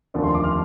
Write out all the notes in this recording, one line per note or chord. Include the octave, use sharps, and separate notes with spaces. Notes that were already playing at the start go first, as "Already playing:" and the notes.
F1 D#2 D3 F3 D5
C6
D6
F6